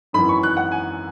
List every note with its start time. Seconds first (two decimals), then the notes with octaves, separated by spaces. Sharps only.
0.13 G#1 F#2 E3 C#4 B5
0.29 C#6
0.43 F#6
0.57 F#5
0.72 G#5